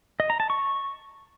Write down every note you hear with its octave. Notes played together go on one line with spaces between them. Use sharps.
D#5
A#5
A5
C#6